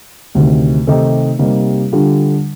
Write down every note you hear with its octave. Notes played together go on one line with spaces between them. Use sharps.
D2 C3 D#3
C3 D#3 A3 D#4 G4
C3 G3 A#3 D#4 G4
D3 G3 D4 F4